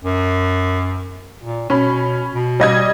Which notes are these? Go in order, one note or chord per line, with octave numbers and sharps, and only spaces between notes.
F#2
A#2
B2 C#4 B5
B2
G3 D#5 G#6